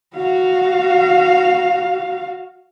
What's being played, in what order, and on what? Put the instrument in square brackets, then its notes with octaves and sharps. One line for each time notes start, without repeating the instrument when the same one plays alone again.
[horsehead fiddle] F#4 F5